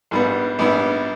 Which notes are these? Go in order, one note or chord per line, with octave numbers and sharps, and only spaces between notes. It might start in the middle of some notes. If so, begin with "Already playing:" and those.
A#1 G#2 G3 B3
A#1 G#2 G3 B3